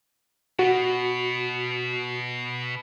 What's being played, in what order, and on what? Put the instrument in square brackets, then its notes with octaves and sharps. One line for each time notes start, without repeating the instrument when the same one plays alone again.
[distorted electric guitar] B2 [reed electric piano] F#4